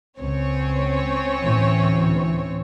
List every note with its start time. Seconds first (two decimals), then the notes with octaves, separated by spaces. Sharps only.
0.19 C#2 C4 C#4 C#5
1.41 D2 A2 E3